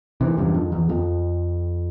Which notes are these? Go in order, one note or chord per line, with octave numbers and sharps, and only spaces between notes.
C3 E3
E2 G2
F2
E2
F2